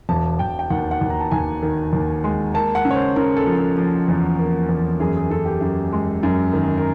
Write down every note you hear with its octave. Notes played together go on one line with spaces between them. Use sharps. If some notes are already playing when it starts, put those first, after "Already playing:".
E1 A5
E1 G5
G5
D#2 F#5
F#5
D#2
A#5
A5
D#2 G#5
D#3
D#2
G#3
A#3 A5
F#5
C#3
C#5
C5
C#3 A#4
A4
F3
A4
F3
E2
A#3
E2
F#2 G#4
G#4
F#2 A4
G4
F#2
G#3
F#2
D#3
A#4